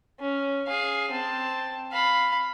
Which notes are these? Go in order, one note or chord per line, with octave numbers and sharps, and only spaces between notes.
C#4
G#4 F5
C4 A5
F5 B5